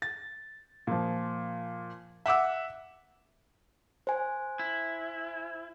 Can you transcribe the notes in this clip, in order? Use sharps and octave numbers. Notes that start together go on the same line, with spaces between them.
A6
A#2 F3
E5 F#5 D6 E6
C5 G#5
E4